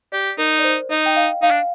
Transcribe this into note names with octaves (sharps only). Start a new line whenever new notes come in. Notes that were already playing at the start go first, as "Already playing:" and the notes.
G4 D5
D#4 A#4
D5
C5
D#4 D#5
G5
F5
D#4 F5
D4